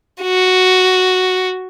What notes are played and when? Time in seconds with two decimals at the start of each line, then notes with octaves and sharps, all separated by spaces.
0.22 F#4